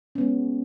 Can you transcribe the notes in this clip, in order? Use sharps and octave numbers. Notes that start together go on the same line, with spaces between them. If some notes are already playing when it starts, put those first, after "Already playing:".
G#3 B3 C#4